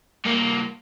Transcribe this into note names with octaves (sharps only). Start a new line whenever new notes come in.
G2 A#3